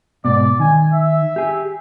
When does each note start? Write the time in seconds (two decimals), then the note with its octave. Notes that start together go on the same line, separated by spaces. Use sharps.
0.25 G#2 B2 D5
0.59 D#3 G#5
0.93 E5
1.36 G4 G#4